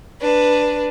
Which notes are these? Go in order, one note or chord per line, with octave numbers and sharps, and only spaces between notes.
D4 B4